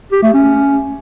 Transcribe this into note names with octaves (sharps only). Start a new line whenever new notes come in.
G4
A3
C#4